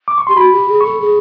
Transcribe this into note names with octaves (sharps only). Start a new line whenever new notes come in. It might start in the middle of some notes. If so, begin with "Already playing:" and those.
D6
C#6
G4 C6
F#4 B5
G4
G#4
A4 C#6
G#4